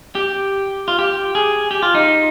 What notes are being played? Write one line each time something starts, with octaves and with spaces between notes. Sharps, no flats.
G4
F4
G4
G#4
G4
F4
D#4